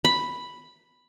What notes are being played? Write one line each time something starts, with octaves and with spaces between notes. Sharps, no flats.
B5